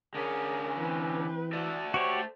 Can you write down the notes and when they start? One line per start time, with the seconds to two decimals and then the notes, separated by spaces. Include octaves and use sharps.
0.15 D3 C#4 G#4 A#4
0.78 E3 C4 B4
1.53 F#4 A4 D5 E5
1.94 F#4 G4 C5 C#5